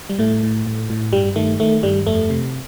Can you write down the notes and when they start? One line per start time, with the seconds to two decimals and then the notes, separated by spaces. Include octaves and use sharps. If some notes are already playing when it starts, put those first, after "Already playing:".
0.09 G3
0.19 A2 A3
0.43 A2
0.67 A2
0.90 A2
1.13 G2 G3
1.36 D#3 A3
1.60 D#3 A3
1.83 G2 G3
2.07 F2 A3
2.30 C3